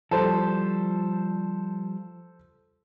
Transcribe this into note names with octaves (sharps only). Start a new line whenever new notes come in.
F3 G3 A4 C5